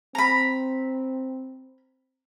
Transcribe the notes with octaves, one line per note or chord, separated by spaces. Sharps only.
C4 A#5 B5